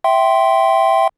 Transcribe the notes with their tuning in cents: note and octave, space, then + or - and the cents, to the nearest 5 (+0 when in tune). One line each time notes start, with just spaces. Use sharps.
E5 +0 G5 -15 C6 +0